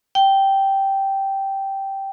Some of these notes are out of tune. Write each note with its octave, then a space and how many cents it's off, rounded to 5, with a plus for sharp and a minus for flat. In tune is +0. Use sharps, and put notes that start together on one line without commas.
G5 -5